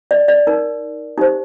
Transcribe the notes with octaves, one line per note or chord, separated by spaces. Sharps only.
D5
D5
D#4 A#4
D#4 G4 C5